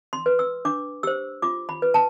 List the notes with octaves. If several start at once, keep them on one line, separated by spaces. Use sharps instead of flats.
C6
B4
E6
D4 D6
G4 C5 E6
F4 D6
B5
B4
A5